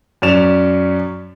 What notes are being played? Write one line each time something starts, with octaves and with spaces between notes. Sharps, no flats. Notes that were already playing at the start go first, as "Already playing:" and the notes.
F#2 C#4 D5 E7 F7